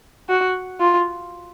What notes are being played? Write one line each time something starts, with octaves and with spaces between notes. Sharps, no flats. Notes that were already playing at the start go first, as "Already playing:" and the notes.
F#4
F4